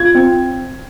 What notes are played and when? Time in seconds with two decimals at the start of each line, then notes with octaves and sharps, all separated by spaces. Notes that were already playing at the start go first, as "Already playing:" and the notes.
Already playing: F4 G#6
0.15 C4